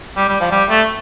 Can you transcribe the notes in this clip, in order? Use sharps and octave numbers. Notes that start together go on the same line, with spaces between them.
G3
G3
F3
G3
A3